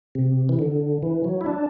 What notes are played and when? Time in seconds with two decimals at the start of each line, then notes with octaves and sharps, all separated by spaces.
0.15 C3
0.49 E3
0.59 D3
1.02 E3
1.24 F#3
1.41 E4
1.46 D4